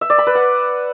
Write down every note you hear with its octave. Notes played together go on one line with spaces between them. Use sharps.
E5
D5
B5
B4
F#5